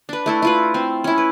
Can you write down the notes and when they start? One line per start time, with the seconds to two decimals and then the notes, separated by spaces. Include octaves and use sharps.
0.09 D4 B4
0.26 A3 E4 A4
0.42 E4 F4 B4
0.74 C4
1.04 C#4 E4
1.18 B4